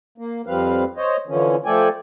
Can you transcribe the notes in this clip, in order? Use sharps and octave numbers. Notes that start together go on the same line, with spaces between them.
A#3
F2 F3 G3 C4 B4 F5
C5 C#5 D#5
D3 E3 F3 C#4
F3 A3 A4 D5 G5 G#5